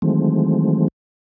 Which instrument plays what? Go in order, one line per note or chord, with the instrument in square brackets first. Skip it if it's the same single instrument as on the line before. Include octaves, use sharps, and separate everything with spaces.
[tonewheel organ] D#3 E3 F#3 G#3 A3 C4